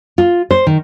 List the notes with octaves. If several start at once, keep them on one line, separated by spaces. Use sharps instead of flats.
F4
C5
D#3